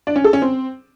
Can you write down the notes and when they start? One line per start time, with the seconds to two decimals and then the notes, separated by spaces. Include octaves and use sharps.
0.07 D4
0.16 C#4
0.24 A4
0.33 C#4
0.42 C4